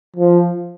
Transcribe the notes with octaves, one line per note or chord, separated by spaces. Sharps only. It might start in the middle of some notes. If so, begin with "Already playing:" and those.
F3